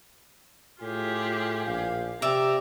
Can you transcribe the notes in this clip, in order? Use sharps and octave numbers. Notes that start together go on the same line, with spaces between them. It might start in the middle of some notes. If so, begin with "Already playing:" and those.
A2 F4 G4 G#4
A#1 F5
C3 G4 D5 E5 A#5